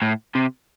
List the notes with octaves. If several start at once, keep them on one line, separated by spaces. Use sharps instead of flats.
A2
C3